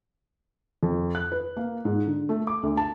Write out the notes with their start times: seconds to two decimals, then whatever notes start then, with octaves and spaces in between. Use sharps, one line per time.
0.83 F2
1.15 F#6
1.32 B4
1.57 A#3
1.85 G#2
2.06 D3
2.29 A3
2.47 D6
2.63 D2
2.77 A5